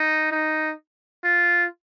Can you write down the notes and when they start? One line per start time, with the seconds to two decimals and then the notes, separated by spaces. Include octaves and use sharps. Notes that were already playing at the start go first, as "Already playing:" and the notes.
Already playing: D#4
0.31 D#4
1.24 F4